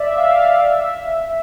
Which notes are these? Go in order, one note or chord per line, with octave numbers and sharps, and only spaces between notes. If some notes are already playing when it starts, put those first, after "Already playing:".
Already playing: D5 E5
F5
E5